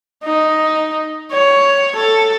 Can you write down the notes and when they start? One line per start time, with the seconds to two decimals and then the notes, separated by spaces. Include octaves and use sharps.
0.24 D#4
1.32 C#5
1.95 A4